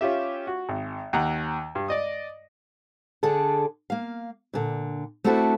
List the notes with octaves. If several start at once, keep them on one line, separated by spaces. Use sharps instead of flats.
C#4 F4 G4 E5
F#4
G#1
D#2 F#5 A#5
G2
D5 D#5 D#6
D3 D4 G#4 A4
A#3 F5
A#2 D3
A3 C4 D4 E4 F#4 A4